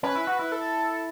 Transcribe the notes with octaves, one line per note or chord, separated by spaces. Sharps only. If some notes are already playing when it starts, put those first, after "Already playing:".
C#4 B4
E4
F#4
E4
A4